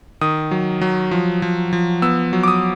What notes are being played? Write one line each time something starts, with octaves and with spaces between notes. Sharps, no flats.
D#3 D#6
F#3
F#3
F3
F3
F3
B3 E6
F#3
D6
D#6